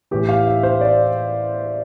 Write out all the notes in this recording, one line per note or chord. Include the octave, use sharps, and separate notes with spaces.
A2 E3 G4
F5
E5
C5
D5